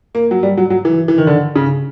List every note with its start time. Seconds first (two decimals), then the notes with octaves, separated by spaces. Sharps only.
0.15 A#3
0.31 F#3
0.43 G3
0.57 F#3
0.70 F#3
0.85 E3
1.08 E3
1.18 D#3
1.27 D3
1.56 C#3